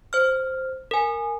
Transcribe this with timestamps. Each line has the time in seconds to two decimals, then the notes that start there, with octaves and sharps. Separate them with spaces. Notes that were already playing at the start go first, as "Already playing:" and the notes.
0.13 C5 F6
0.91 A#4 G#5